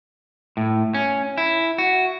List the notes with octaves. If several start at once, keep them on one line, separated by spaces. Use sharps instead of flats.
A2
C#4
E4
F#4